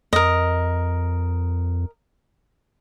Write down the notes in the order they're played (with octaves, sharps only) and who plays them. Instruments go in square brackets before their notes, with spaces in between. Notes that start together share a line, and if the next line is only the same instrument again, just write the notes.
[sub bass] F2 [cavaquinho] A#4 D#5